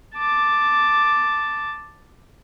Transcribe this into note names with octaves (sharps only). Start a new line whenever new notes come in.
A5 D6